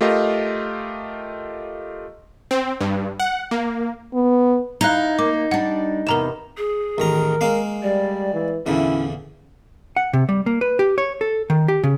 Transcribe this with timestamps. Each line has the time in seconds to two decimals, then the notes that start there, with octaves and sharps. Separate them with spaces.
0.01 A3 F4 G4 A#4 D#5 F5
2.51 C4
2.81 G2
3.20 F#5
3.51 A#3
4.14 B3
4.81 D#4 E4 D#5 F5 A#5 F#6
5.19 A#3 D6
5.51 G3 D4 F#5
6.07 E2 C3 B3 A#4 A#5 E7
6.57 G#4
6.98 A1 D#3 A#4 A#5
7.41 G#3 A#3 F5
7.83 G3 D5
8.34 E3
8.66 E2 A#2 D3 C#4 E4
9.96 F#5
10.13 C3
10.29 G3
10.46 A#3
10.61 B4
10.79 G4
10.98 C#5
11.21 A4
11.50 D#3
11.68 G4
11.84 C#3